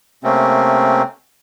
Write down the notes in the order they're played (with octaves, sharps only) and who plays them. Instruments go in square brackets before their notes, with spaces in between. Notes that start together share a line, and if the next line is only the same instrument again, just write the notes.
[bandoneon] C3 A3 A#3 C4 C#4